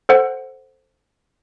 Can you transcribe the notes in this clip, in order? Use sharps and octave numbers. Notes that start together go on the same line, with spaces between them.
A4 C5 F#5